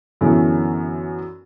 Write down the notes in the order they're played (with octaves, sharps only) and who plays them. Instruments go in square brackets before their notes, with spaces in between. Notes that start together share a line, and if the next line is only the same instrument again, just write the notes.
[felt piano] F#2 D3 E3 B3 C#4